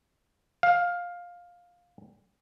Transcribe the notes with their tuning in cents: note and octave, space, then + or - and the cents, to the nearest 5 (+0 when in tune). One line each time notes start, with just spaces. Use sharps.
F5 +10